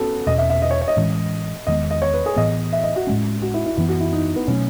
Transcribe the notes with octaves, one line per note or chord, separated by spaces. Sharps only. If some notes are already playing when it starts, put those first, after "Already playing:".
Already playing: B3 C#4 F#4 A4
E2 B2 A3 C#4 D#5
E5
E5
D#5
C#5
C#5
D#5
A2 E3 G#3 C#4
E2 D#3 G#3 B3 D#5
D#5
C#5
B4
G#4
A2 E3 B3 D#5
E5
D#5
F#4
A2 G#3 C#4
F#4
E4
E4
F#2 E3 B3 E4
F#4
E4
D#4
B3
B2 F#3 A3 C#4